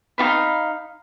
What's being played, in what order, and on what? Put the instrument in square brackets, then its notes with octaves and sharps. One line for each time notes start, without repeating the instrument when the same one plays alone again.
[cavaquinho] D#4 F#4 F5 B5